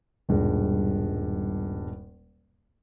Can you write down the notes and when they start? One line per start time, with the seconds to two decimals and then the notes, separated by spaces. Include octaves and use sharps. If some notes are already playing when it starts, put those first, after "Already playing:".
0.29 D#1 G2 B2 G#3